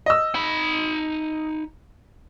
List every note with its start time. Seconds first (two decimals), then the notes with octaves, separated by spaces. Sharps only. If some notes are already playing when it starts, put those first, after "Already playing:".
0.06 D#5 E6
0.35 D#4 B5